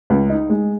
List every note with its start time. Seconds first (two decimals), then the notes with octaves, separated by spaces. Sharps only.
0.10 C#2
0.29 D#4
0.49 G#3